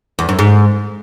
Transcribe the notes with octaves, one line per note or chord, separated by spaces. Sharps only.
E2
F#2
G#2